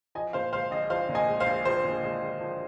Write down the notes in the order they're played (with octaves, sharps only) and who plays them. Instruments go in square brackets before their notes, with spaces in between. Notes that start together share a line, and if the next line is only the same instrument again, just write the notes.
[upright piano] F3 D#5 G#5
A#2 C5 F5
G#3 C5 F5
A#1 D#5
F3 C5 F5
A#2
D#5 G#5
G#3
C5 F5
A#1
F3 C5
A#2
G#3
A#1
F3